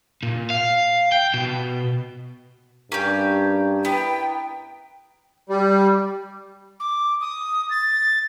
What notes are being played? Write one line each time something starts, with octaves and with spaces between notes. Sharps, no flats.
A#2
F5
G5
B2
G2 C#4 G4 A#4
B3 E4 G5
G3
D6
D#6
A6